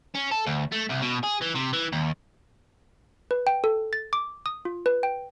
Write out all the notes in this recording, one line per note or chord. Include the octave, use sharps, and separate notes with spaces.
C#4
A4
D2
A3
C2
B2
G#4
E3
C3
E3
D#2
B4
G5
A4
A6
D6
D#6
F4
B4
G5